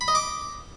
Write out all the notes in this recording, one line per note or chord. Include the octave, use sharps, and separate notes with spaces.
B5
D#5
D6